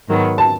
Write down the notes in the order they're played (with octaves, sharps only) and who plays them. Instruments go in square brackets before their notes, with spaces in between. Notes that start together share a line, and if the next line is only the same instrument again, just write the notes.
[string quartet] G#2 D#3 F#3 B3
[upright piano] A5